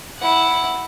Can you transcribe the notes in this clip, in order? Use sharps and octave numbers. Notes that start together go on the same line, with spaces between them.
E4 F#5